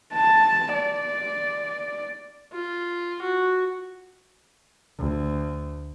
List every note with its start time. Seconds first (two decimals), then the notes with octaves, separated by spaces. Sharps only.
0.13 A5
0.74 D5
2.53 F4
3.22 F#4
4.97 D2